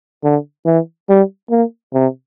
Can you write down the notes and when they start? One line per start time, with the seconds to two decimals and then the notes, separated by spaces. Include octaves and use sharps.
0.24 D3
0.66 E3
1.09 G3
1.50 A#3
1.94 C3